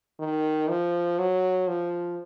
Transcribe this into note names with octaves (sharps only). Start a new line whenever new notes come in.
D#3
F3
F#3
F3